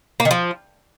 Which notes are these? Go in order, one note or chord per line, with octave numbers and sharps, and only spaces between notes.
A#3
D#3
F3